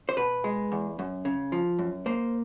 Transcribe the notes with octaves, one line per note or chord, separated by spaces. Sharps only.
C5
B2 B4
G#3
E2
F#2
C#3
F3
F#2
A#3 C5